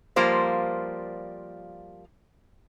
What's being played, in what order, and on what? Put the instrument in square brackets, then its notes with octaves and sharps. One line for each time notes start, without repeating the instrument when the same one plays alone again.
[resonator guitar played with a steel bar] F3 G3 A#3 F4 C5 D5